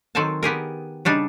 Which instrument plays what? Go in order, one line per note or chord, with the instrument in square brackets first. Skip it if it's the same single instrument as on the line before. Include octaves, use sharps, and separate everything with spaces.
[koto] D#3 F#3 C4 A4 G#5 A5
B3 G4 G#4 A#4
C#3 G3 D4 D#4